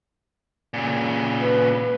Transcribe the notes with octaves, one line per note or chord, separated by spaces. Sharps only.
A#2 C#3
B4